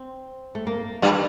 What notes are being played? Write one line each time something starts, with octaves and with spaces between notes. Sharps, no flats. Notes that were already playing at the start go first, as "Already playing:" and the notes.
Already playing: C4
A3
A#3
G2 G3